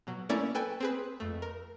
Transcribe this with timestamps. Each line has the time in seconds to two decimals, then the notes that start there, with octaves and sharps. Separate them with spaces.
0.07 B2 F#3
0.29 A3 A#3 C#4 E4 A#4 D5
0.55 A4 B4 G5 G#5
0.80 C4 G#4 B4
1.20 F2 A3
1.42 A#4